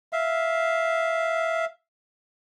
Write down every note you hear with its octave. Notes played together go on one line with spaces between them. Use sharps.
E5 F5